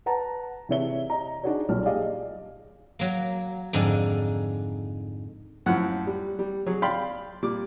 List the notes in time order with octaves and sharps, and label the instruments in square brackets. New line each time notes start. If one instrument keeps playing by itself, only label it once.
[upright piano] B4 F#5 A5 A#5
C3 E3 G#4 C#5 E5 G7
D#5 A#5
D4 D#4 F#4 G#4 C#5
B1 A#2 G3 F6
G4 G#4 D5 D#5 F5
[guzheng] F#3 A#3
F2 G#2 D3 D4 D#4
[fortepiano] F#2 A2 F3 F#5
G3
G3
F#3 G#4
D5 F5 G5 B5 C6
A#2 G3 D6